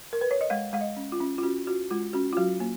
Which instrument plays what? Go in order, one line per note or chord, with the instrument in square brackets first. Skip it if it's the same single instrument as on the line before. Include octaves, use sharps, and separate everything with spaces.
[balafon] A#4
B4
C#5
D#5
G#3 F5
G#3 F5
D#5
C#4
F4
C#4
F4
C#4 F#4
F4 F#4
G#3 F4
C#4 F#4
F4
F#3 F#4
A#3